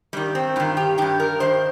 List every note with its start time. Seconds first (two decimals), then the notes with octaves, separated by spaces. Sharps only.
0.13 G2 D#3 G3
0.35 C4
0.56 G2 D#3 F4
0.77 G4
0.98 G2 D#3 G4
1.20 A#4
1.40 G2 D#3 C5